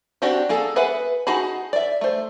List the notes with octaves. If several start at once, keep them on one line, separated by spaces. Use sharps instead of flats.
C4 D4 F#4 G4 C5
A#3 G#4 A4
G#4 B4 E5 F#5
D#4 F#4 G#4 A5 B5
D5 E5
A3 C5